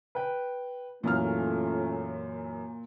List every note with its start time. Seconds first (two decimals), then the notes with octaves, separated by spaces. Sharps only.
0.15 B4 G5
1.04 F#2 A#2 E3 A3 C#4 F4 F6